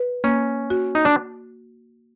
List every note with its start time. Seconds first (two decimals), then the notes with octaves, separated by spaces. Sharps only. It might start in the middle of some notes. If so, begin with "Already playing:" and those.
Already playing: B4
0.24 A#3 C#4
0.70 F#4
0.95 D#4
1.05 D4